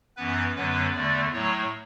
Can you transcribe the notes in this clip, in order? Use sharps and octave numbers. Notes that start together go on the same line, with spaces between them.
F#2 E3 B3 B4
F#2 D3 F#3 B3 B4
E2 D3 A3 D5
A2 F#3 A3 C#5